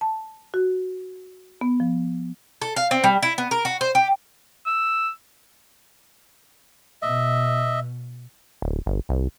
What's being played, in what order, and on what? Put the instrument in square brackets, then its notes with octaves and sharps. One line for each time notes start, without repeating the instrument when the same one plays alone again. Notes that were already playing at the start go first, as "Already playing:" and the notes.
[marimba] A5
F#4
B3
F3
[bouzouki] A4
F5
C4
G3
E4
B3
A#4
F#4
C5
G4
[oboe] E6
[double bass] B2 [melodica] D#5 E5
[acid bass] D1
G1
C2